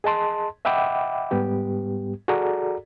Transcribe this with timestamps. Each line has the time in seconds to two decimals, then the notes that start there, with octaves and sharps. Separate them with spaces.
0.04 G#4 D#5 A5 C6
0.65 D#5 E5 F#5 G5 B5 D6
1.31 G#2 G3 B3 G4
2.28 F#4 G#4 A4 D5 A#5